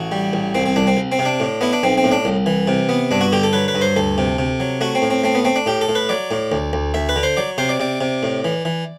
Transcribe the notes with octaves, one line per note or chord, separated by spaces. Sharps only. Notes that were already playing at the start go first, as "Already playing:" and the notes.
Already playing: A1 F#4
G3
A1
C2 C4
C4
C2 D4
C4
C2
C4
C3
D4
A2
B3 E4
D4
B1 C4
C4
A2
D4
C2
E3
C3
B3
G2 D4
F#4
D3 G4
A4
F#3 B4
B4
G2
C5
D2 A4
C3
C3
F#3
A3 F#4
C4
A2
C4
A3 C4
B3
A3 C4
D4
A2 G4
A4
A2
B4
F#3 D5
A2
D2
D2
D2 E5
B4
D3
C5
F#3 D5
C3 C5
D5
C3 D5
C3
A2
E3
E3